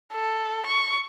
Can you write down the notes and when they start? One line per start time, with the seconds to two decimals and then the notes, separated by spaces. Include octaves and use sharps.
0.13 A4
0.66 C#6